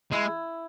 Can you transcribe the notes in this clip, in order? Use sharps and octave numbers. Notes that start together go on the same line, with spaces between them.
G#3 E4